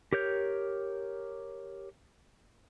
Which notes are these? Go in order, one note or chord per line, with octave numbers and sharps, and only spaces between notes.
G4 A#4 C#5 G6